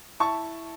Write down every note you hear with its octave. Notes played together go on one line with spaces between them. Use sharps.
E4 A5 C#6